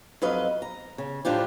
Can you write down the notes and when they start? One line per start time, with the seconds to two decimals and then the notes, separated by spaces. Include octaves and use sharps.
0.22 F2 F#3 B4 D#5 F5
0.62 A#5
0.98 C#3
1.25 F#2 A2 F3 D4 F4 G4